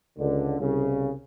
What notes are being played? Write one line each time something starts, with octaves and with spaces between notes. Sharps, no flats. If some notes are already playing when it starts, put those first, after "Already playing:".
C#2 D3
C2 C#3